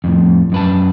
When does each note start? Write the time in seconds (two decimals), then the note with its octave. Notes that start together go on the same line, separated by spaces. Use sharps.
0.04 F2 A2
0.52 F#2 B4 A5